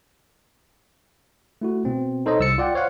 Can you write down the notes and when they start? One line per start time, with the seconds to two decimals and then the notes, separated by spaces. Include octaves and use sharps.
1.61 A3 E4 F#4
1.85 B2 C4
2.26 D#4 A4 C5 C#5 D#5
2.40 C2 E6 A6 C#7
2.58 F4 D5 F#5 G5
2.74 C5 C#5 F5 F#5